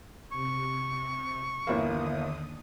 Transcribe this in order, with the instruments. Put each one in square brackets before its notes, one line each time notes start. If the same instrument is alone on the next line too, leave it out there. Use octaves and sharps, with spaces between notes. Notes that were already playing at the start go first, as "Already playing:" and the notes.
[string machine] C3 [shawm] C#6
[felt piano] G1 E3 A#3 [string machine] D#2 D3 D#6